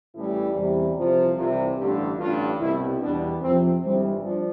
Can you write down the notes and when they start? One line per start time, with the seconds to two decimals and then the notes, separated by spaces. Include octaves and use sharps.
0.13 A1 A2 E3 G3 E4
0.54 E2 C3 E3 G3
0.95 C2 C3 F3
1.36 C2 C3 E3 G3 F4
1.77 A1 G2 D3 G3 G4
2.18 A1 G2 D3 F4
2.59 C2 B2 G3 E4
3.00 E2 B2 G3 D4
3.41 F2 C3 F3 C4
3.82 G1 F2 E3 G3 C4
4.22 F3 D4